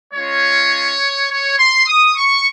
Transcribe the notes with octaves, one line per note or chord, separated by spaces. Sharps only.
G#3 C#4 F4 C#5
C#5
C6
D#6
C#6